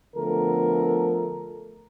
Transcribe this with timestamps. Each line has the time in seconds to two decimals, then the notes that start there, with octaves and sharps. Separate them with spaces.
0.16 D3 F3 A3 B3 A4 A#4